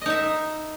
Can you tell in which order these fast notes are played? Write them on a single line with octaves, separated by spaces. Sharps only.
D#5 D#4 E5